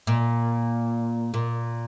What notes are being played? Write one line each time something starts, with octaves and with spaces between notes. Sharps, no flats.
A#2
A#2